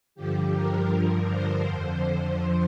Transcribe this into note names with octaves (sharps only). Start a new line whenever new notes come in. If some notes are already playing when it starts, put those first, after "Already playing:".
G2 D3 F3 G4
A#4
G2 D3 F3
C5
F2 D3 F3 C5